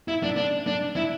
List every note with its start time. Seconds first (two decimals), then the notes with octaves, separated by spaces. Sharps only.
0.08 E4
0.23 D4
0.37 D4
0.67 D4
0.96 E4